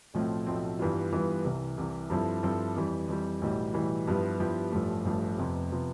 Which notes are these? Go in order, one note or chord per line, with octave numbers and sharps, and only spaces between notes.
B1 A2 F3 A3 C4
B1 A2 F3 A3 C4
G2 E3 G3 B3 F4
G2 E3 G3 B3 F4
C2 C3 E3
C2 C3 E3
G2 F3 C4 E4 A4
G2 F3 C4 E4 A4
F2 E3 G3
F2 E3 G3
B1 A2 E3 G3
B1 A2 E3 G3
G2 F3 B3 E4 G4
G2 F3 B3 E4 G4
A1 G2 F3 A3
A1 G2 F3 A3
F1 F2 C3 F3 B3
C3 F3 B3